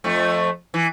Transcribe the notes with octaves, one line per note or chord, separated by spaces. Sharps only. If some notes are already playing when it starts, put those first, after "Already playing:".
F2 F3 A3
E3